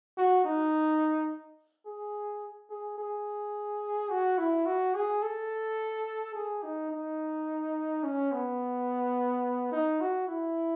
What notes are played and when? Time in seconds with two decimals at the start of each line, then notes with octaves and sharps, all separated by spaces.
0.17 F#4
0.45 D#4
1.85 G#4
2.70 G#4
2.98 G#4
4.10 F#4
4.38 E4
4.66 F#4
4.94 G#4
5.22 A4
6.35 G#4
6.63 D#4
6.91 D#4
8.03 C#4
8.32 B3
9.72 D#4
10.01 F#4
10.28 E4